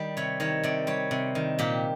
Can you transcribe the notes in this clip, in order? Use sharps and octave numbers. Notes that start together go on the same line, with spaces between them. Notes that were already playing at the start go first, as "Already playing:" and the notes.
Already playing: D#3 G3
C3 C#5
D#3 C#5
C3 D5
G3 C#5
C3
D#3
A#2 G4